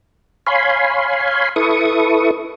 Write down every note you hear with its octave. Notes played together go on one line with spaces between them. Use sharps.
C#5 F5 G#5 B5 C6
E4 A4 B4 C#6 D#6